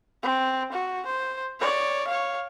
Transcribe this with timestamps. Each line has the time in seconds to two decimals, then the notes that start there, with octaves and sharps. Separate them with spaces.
0.23 C4
0.73 F#4
1.06 C5
1.60 C#5 D5
2.07 C#5 F5